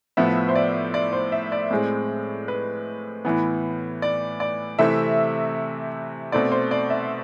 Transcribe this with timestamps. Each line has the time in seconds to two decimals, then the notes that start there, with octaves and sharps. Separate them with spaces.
0.17 A2 F3 B3 E5
0.49 C5
0.55 D5
0.94 D5
1.13 C5
1.32 E5
1.52 D5
1.71 A2 G#3 C4
2.48 B4
3.25 A2 E3 B3
4.02 D5
4.40 D5
4.79 C3 E3 A3 C4 E5
6.32 B2 A3 C4 D5
6.52 C5
6.71 D5
6.90 E5